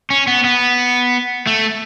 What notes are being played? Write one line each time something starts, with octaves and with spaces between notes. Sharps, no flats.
C#4
B3
B3
A3